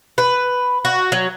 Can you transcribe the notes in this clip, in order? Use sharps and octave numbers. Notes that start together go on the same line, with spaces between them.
B4
F#4
F#3